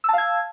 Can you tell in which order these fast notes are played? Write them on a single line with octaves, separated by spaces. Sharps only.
E6 A5 F5 G#6